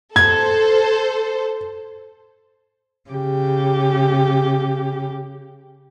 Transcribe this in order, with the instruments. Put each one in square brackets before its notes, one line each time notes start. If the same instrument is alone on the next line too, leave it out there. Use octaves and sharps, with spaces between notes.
[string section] A4 C5 [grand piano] G#6
[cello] C#3 G4